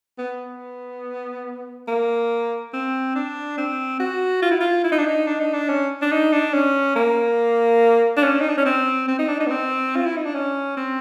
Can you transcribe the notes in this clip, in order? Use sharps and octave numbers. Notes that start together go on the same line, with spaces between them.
B3
A#3
C4
D4
C4
F#4
F4
E4
F4
E4
D#4
D4
D#4
D4
D#4
D4
C#4
D4
D#4
D4
C#4
A#3
D4
C#4
D#4
D4
C#4
C4
C4
D#4
D4
D#4
B3
C4
F4
E4
D#4
D4
C#4
C4